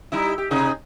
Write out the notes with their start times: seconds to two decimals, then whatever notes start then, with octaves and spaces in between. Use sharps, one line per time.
0.12 G3 D#4 E4
0.38 G4
0.51 C3 D#4 G#4